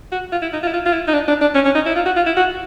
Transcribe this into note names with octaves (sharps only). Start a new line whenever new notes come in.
F#4
F4
E4
D#4
F4
E4
F4
F4
E4
D#4
D4
D4
D4
C#4
C#4
D#4
E4
F4
F#4
F4
E4
F#4